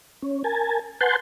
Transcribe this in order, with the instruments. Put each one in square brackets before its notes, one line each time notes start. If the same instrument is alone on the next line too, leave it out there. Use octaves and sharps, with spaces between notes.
[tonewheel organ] C#4
A#4 G#5 A5
B4 F#5 G#5 A5 C6 G6